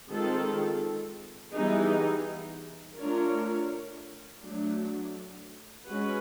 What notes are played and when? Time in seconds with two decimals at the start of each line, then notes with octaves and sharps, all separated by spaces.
0.10 D#3 G#3 C4 F4 A4
1.55 E3 G3 B3 D#4 G#4
2.99 A3 D4 F4 A#4 C#5
4.43 F#3 A3 D4
5.87 G#3 C#4 F#4 B4